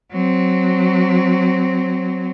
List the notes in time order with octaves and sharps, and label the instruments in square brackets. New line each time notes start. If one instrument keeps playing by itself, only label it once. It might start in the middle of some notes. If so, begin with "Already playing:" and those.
[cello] F#3 C4